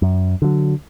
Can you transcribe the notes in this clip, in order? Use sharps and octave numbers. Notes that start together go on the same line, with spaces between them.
F#2
D3 F#3